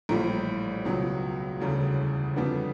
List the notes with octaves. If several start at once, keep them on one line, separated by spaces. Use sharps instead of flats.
A#1 A2 E3 G3
C#2 B2 F#3
E1 D2 C#3 E3 G3
F2 D3 G3 B3 D4